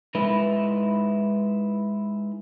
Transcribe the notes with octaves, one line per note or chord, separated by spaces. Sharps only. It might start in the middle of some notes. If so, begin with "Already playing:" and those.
G#3 D#4 E4 B4